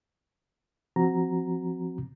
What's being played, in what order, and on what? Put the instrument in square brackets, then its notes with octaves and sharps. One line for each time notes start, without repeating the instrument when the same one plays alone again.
[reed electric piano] F3 C4 F#4 A#5